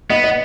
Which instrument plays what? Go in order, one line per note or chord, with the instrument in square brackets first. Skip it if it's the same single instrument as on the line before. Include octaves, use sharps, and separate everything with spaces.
[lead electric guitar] B3 [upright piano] D#5
[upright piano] D#5